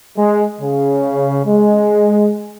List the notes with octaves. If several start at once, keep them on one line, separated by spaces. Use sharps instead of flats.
G#3
C#3
G#3